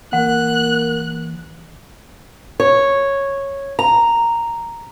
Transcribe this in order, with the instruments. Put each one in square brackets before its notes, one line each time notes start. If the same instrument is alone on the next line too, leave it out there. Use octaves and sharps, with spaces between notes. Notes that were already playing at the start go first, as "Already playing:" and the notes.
[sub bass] E3 [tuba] A#3 [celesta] F#5 [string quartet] F#6
[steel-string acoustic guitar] C#5
A#5